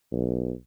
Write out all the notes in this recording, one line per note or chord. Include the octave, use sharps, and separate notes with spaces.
B1